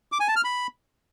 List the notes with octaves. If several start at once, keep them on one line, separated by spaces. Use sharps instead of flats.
D6
G#5
A5
F6
B5